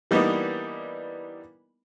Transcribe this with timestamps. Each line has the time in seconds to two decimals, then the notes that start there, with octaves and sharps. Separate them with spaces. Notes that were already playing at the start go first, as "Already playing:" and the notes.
0.11 E3 G3 A#3 B3 D4 D#4